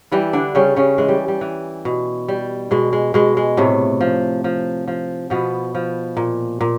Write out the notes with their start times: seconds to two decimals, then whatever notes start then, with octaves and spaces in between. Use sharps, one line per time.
0.12 E3 G3 E4
0.33 D3 D4
0.55 C#3 G3 C#4
0.76 C#3 C#4
0.98 E3 G#3
1.09 G3
1.28 G3
1.41 E3
1.85 B2
2.28 G3
2.71 B2 G#3
2.93 G#3
3.14 B2 G#3
3.37 G#3
3.57 A2 C3 A3
4.01 F3
4.44 F3
4.88 F3
5.30 B2 F3 B3
5.75 F3
6.17 A#2
6.61 A#2